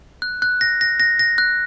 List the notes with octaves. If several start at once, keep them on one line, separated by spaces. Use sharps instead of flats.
F#6
F#6
A#6
A#6
A#6
A#6
F#6